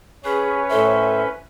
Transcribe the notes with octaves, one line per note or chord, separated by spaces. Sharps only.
C#4 G#4 B4 C#5
A2 A4 C5 E5